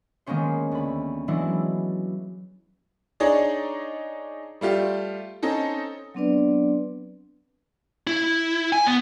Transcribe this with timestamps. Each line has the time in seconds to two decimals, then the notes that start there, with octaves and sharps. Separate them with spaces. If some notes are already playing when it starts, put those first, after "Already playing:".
0.26 D#3 G#3 A#3 B3 C#4 C5
0.71 D2 B5
1.28 E3 F#3 G#3 D4 E4
3.20 D4 D#4 G#4 C#5 D5
4.61 G3 A3 F4 G4
5.42 C4 C#4 D#4 A4
6.14 F#3 B3 C4 D4 B4 D5
8.07 E4
8.73 G#5
8.87 B3